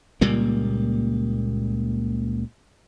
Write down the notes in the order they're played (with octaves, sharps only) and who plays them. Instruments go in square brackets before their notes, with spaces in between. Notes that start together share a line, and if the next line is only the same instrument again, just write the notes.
[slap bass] C#2 A#2 G3 A#3